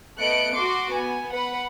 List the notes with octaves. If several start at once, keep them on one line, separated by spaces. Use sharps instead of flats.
A3 B3 D#5 F#6 C#7 D7
F#4 C6 D6
B3 G#5
B4 F#5 B5